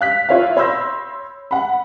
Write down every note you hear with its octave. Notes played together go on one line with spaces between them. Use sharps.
F5 F#6 B6
E4 F4 C#5 D5 E5 F5
C#5 B5 C6 E6 G6 A#6
F#5 B5